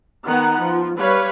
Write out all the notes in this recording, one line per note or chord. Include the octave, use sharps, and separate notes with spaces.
D#3 B3 D#4 F#5 A#5
F3
G3 B4 C#5 F5